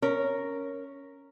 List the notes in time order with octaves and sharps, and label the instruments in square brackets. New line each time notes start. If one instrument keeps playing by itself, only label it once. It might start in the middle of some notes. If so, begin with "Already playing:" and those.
[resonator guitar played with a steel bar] C#4 A#4